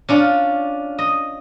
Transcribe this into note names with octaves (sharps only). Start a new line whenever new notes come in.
C#4 D4 F4
D#5